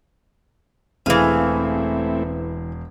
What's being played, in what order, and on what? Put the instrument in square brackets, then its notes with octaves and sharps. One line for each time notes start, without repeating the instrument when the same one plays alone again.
[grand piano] E1 G#4 D#7 [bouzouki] E3 F5 [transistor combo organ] A3 C4 E4